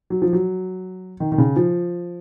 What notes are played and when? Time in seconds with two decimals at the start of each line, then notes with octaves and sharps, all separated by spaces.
0.10 F#3
0.22 F3
0.33 F#3
1.20 D#3
1.32 D#3
1.38 C#3
1.56 F3